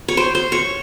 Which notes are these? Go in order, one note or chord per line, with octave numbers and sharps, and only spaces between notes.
C#5
C5
C5
C#5